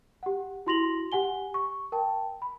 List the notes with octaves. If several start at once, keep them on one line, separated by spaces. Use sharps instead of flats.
G4 F#5
E4 F#4 C6 A#6 F7 F#7
G4 F#5 G#5 G7
C#6
A#4 G5 A5
B5